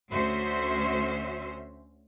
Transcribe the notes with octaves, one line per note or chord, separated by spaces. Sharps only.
D2 C#4 F#4 C5 E5